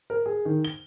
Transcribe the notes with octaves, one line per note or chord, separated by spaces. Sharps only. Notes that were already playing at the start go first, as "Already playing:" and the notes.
A#4
G#4
D#3
G7